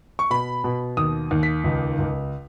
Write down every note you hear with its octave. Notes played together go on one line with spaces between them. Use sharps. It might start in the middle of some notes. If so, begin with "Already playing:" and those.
C#6
B2 B5
B2
D#2 D#6
D#2
B6
C#2
C#2